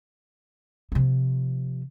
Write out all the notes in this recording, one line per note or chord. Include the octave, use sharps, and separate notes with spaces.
C3 F3